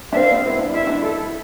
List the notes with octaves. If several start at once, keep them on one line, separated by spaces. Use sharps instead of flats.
D4 E5
C4 F5
B3
E4
D4
E4 E5
D4
E4 A4